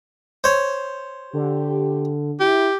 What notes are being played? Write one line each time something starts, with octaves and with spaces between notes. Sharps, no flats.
C5 C#5
D3 G4
E4 G4